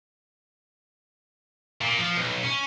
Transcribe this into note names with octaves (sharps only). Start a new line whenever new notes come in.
A#2
F3
B1
C#4